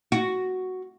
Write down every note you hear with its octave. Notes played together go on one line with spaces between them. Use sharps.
F#4